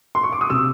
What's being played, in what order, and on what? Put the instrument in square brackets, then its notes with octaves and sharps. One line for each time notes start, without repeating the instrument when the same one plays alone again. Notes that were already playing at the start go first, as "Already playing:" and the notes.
[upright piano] C6
C#6
D6
D#6
C3 E6